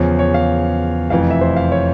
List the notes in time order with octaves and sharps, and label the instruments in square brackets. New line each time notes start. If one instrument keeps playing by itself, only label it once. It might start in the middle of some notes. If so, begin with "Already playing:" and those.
Already playing: [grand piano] E2 C#3 F3 C#5
C#5
F5
F1 F2 E3 F5
E5
C5
F5
C#5